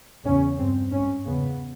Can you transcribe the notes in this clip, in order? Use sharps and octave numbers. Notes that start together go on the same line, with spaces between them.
E2 C#3 C#4
G2 C4
G#2 C#4
E2 C#3 B3